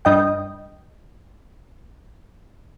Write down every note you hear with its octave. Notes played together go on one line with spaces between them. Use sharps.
G2 D#5 G5